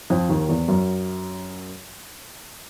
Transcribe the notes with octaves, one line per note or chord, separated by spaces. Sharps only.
F2 F3
D#2 D#3
E2 E3
F#2 F#3